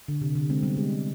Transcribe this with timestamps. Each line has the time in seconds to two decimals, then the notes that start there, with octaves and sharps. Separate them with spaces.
0.08 D3
0.21 C3
0.35 D3
0.49 G#3 C4
0.63 G3 B3
0.77 G#3